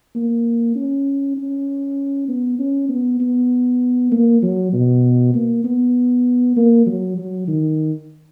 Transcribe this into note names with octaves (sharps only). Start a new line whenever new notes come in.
A#3
C#4
C#4
B3
C#4
B3
B3
A#3
F#3
B2
A#3
B3
A#3
F#3
F#3
D#3